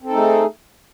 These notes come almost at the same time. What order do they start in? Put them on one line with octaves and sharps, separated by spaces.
C4 A4 D#4 A3 G#4